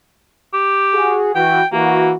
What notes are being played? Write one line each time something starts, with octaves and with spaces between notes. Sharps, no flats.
G4
F#4 G#4
E3 F#4 G5
E3 A#3 F#4